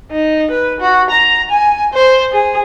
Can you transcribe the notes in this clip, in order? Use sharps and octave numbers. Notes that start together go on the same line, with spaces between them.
D#4
B4
F#4
A#5
G#5
C5
G#4